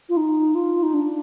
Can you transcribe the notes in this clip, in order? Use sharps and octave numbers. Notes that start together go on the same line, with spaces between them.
F4
D#4
F4
D#4
D4